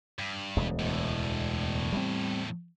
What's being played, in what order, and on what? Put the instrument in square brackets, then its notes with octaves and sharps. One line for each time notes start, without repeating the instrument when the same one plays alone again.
[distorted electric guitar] G2
[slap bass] E1 D2 G#3
[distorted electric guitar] E2 A2
[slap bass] G3 G#3 C4